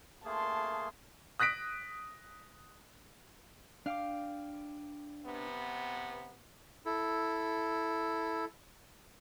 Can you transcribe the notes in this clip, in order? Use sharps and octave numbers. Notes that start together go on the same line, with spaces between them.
A3 A#3 G#4 A5 C6
D#6 F#6 A#6 B6 D7
D4 F5 G5 D6
C3 B3
E4 A4